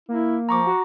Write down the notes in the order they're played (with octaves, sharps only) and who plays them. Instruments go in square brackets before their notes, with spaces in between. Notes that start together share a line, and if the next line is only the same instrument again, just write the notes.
[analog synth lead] A#3 [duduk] E4
[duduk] F3 [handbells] A#5 C#6 D6
[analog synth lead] F#4